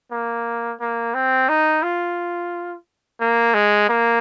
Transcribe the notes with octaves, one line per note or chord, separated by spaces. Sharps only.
A#3
A#3
C4
D#4
F4
A#3
G#3
A#3